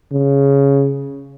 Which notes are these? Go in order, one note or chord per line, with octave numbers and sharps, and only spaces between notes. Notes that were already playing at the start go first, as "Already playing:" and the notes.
C#3